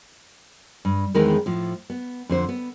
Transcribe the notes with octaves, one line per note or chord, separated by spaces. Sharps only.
G2
E2 D#3 G#3 C4 A#4 B4
A2 F3
B3
F2 D3 C5
B3